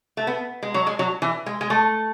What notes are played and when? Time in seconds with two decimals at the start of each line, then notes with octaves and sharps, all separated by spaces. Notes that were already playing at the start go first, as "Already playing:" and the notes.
0.17 A3
0.27 B3
0.63 G#3
0.74 F#3
0.87 G#3
0.99 F#3
1.22 E3
1.46 G#3
1.61 G#3
1.70 A3